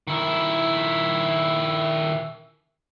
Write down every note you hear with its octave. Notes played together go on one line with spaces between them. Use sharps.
D#3 E4